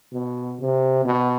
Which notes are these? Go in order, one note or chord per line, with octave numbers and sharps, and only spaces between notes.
B2
C3
B2